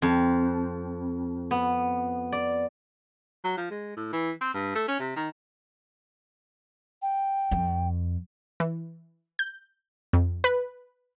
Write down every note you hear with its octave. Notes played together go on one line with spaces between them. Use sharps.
F2
B3
D5
F#3
F3
G#3
A2
E3
C4
G2
A3
C#4
C3
D#3
G5
F2
E3
G6
F2
B4